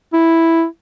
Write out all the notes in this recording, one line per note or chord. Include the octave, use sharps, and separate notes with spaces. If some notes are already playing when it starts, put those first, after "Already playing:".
E4